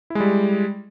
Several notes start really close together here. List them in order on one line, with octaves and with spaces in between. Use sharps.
E4 G#3 G3